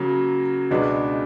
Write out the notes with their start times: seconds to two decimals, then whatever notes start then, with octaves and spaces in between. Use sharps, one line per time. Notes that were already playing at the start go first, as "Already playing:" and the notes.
Already playing: C#3 F#3 A#3
0.71 C#2 B2 G#3 B3 D4